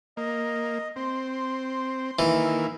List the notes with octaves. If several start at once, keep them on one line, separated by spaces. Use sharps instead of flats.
A#3 D#5
C4 C6
D#3 E3 A#3 E4